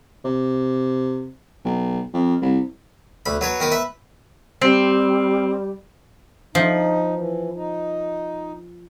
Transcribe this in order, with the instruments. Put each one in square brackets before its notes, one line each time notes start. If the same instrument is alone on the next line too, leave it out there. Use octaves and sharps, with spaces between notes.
[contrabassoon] C3
B1
F2
C2
[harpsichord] D2 B5
F#3 B4 C#5
D#3 A#4 B4
B4 E5
[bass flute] G3 [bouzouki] C4
[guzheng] F3 [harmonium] D#4
[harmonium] E3
D#4